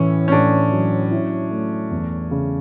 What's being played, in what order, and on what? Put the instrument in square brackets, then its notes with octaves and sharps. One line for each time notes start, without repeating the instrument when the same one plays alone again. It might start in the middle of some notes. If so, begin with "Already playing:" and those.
Already playing: [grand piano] A2 E3 [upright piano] C#4
[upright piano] C#4
[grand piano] A2 [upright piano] D4
[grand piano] F#3
E4
A3
E2
C#3